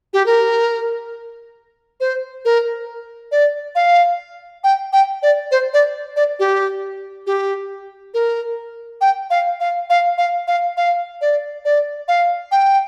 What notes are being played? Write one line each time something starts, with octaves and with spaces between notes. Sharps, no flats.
G4
A#4
C5
A#4
D5
F5
G5
G5
D5
C5
D5
D5
G4
G4
A#4
G5
F5
F5
F5
F5
F5
F5
D5
D5
F5
G5